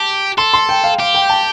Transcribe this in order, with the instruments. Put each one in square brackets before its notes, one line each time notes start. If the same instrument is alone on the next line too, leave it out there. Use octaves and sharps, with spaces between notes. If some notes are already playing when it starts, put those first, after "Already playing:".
Already playing: [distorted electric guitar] G4 [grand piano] A5
[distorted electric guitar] A4 [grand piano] C6
[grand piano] C6
G5
F5
[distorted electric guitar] G4 [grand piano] F5
[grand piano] G5
A5